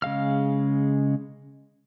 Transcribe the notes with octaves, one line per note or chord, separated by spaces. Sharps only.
C#3 G#3 F5 F6